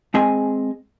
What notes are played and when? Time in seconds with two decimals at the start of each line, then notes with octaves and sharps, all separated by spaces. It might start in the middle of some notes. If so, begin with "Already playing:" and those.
0.14 G#3 C4 G#4 D#5 G#5